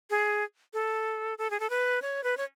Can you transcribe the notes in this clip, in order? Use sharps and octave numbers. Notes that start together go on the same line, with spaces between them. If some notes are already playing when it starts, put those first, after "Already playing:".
G#4
A4
A4
G#4
A4
B4
C#5
B4
C#5